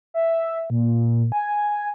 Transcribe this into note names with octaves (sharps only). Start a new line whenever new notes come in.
E5
A#2
G#5